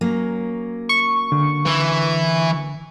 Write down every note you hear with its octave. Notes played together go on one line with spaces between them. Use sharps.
F#3 A#3 C#4
C#6
D3
E3